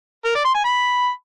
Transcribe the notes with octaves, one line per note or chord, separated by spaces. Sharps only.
A#4
D5
C6
G#5
B5